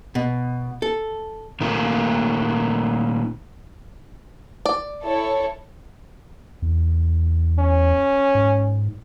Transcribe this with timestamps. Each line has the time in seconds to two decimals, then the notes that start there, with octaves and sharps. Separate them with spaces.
0.15 B2
0.82 A4
1.61 A#2 D#3 A3 A#3
4.66 D5
5.03 E4 A4 C#5
6.62 E2
7.59 C#4
8.35 G#2